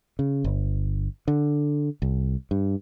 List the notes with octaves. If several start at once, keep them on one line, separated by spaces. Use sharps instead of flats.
C#3
G1
D3
C2
G2